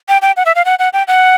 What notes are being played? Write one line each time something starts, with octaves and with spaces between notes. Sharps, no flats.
G5
G5
F#5
E5
F5
F#5
F#5
G5
F#5